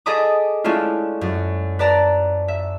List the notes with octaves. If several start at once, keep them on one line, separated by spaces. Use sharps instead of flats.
G#4 A4 D#5 B5 D6 D#6
G#3 A3 C#4 D4 E4 F4
F#2
B4 D5 A5 A#5
E5